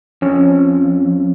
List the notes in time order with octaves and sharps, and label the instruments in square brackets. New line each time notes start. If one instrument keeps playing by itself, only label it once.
[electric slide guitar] F2 [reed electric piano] C#4